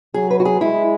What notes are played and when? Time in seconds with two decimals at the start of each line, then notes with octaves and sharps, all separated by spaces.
0.14 F#3 G#4
0.31 B4
0.40 F#4
0.45 G#4
0.61 G#3 E4